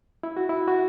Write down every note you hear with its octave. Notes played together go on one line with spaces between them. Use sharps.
E4
F#4
E4
F#4